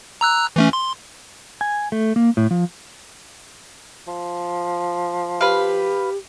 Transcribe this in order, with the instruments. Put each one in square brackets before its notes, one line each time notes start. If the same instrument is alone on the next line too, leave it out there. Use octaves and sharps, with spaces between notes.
[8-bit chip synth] A#5 E6 F#6
E3 A3 C#4
C6
[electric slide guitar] G#5
A3
A#3
A2
F3
[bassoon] F3
[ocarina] G4 [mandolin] B4 F5